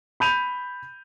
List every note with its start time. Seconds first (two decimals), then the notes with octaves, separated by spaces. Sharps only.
0.20 B5 G6 D#7 F7